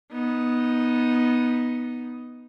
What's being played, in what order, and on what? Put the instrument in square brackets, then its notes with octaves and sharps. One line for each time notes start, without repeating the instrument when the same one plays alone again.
[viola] B3 D#4